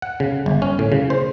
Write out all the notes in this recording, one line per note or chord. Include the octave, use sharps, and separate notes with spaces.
F#5
C#3
G1
C#4
A2
C#3
C5